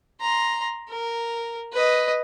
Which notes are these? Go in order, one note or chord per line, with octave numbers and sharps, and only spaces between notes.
A#5 C6
A#4
B4 D#5